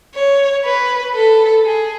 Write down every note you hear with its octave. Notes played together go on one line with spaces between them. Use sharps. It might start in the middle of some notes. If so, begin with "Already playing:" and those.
C#5
B4
A4
G#4